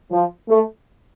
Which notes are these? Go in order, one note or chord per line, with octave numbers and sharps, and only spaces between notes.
F3
A3